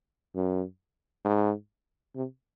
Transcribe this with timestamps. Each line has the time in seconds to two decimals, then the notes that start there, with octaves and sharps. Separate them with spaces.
0.35 F#2
1.25 G#2
2.16 C3